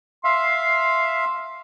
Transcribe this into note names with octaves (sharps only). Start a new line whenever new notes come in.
E5 F5 C6